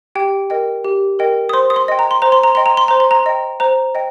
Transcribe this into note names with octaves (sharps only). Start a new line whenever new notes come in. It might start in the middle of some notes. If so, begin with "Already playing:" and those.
G4 G5
A#4 D#5 G5
G4
A#4 D#5 G5
D#6
C5 C6
D#6
C6
D#5 G5
A#5
C6
C5 A#5
C6
A#5
D#5 G5 C6
A#5
C6
C5 A#5
C6
A#5
D#5 G5
C5 A#5
D#5 G5